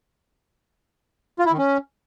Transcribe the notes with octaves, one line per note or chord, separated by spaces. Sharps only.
F4
E4
D#3
C#4